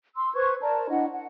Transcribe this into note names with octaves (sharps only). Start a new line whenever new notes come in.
C6 E6
B4 C5 C#6 G#6
A#4 D5 A5 A#5
D4 E4 D#5 F#5
F#5